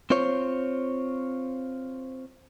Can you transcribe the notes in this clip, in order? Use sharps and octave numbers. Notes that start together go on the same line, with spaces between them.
C4 F4 C5 C#5